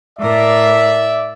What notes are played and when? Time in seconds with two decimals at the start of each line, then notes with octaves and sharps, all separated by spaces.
0.19 A2 A#4 D5 E5